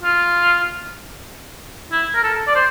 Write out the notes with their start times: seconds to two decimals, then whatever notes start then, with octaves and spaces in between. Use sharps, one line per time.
0.03 F4
1.91 E4
2.15 A#4
2.23 A4
2.47 D5
2.55 C5